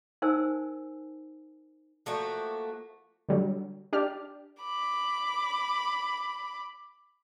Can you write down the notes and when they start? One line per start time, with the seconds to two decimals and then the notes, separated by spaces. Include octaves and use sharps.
0.22 D#4 A#4 C5 G#5 A5 E6
2.06 F3 A3 A#3 F#4
3.29 D3 F#3 G3
3.93 D4 G4 D5 F6
4.63 B5 D6